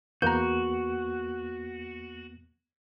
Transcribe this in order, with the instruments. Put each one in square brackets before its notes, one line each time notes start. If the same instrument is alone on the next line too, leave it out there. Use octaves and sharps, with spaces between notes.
[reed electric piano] E2 A#3 B3 [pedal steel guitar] F#4 [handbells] A#5 G6